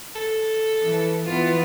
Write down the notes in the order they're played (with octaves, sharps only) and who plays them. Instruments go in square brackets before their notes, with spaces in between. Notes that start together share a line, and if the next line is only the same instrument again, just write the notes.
[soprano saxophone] A4
[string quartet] E3
E3 B3 F4